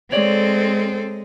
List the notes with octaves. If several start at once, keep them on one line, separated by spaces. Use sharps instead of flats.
G#3 C4 A4 C#5 D5